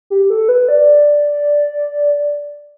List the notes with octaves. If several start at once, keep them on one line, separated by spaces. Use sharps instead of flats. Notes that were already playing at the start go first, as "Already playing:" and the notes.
G4
A4
B4
D5